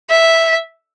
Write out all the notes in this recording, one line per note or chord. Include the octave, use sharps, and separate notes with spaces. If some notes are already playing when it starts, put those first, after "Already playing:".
E5